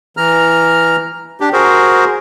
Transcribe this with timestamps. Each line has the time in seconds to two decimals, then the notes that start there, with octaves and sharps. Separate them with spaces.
0.17 E3 A#5 F6
1.41 D4 G4
1.53 F#4 G#4 A#4 C5